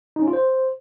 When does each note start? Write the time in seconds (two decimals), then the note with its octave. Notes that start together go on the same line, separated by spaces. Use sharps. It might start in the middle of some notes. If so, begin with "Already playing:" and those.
0.16 D#4
0.22 C#4
0.28 F4
0.33 C5